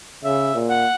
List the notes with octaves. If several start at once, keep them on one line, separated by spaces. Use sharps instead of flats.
C#3 E5
A#2
F#5